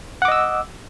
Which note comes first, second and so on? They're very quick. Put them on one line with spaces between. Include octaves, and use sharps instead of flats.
F#5 D6 D#5 E6